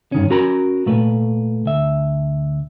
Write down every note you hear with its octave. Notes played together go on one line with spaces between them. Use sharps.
G2 D#3 C#4
C#4 F#4 A#4 A#5 B5
A#2 A3 B4
D2 E5